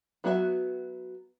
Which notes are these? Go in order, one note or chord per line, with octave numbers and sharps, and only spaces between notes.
F#3 B3 F#4 A4 E5